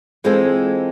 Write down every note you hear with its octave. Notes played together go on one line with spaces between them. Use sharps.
E3 G#3 C4 F4 A4